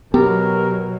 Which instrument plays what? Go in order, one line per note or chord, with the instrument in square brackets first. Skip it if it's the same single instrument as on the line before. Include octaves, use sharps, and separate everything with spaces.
[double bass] B2 F#3 [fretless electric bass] B3 [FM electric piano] G4 [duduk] A#4